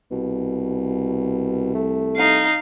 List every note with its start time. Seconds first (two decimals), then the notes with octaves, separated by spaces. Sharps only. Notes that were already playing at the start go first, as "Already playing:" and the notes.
0.11 C2 B2
1.75 A3
2.17 D#4 F5